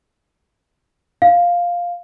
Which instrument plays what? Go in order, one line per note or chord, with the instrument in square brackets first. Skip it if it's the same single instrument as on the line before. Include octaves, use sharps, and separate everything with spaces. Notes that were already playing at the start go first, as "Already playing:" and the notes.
[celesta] F5